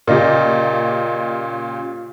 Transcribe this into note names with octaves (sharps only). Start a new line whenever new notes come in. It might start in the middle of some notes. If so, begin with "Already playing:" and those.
A#2 C#3 G4 A#4 D5 D#5